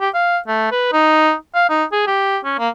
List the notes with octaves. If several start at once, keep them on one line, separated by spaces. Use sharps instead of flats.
G4
F5
A3
B4
D#4
F5
D#4
G#4
G4
C#4
A#3